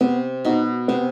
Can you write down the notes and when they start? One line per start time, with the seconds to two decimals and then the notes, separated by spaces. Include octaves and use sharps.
0.01 C3 B3
0.45 B2 D#4 F#4
0.88 C3 B3